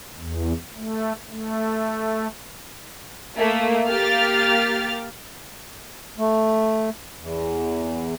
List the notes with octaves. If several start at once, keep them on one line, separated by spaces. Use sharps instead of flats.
E2
A3
A3
A3 A#3
A#3 G4 F6 A6
A3
E2